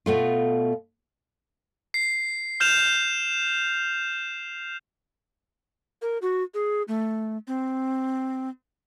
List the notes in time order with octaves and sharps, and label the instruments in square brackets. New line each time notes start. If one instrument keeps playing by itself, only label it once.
[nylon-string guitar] B2 A3 F4
[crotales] C7
F6 G6 E7 F7
[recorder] A#4
F#4
G#4
A3
C4